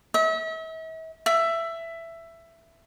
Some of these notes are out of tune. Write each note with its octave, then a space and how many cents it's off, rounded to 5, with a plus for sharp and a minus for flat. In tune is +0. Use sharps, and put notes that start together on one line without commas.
E5 -40
E5 +15